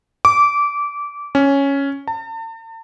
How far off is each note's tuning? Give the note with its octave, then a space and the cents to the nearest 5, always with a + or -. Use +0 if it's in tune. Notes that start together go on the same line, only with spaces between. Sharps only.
D6 -20
C#4 +0
A5 +40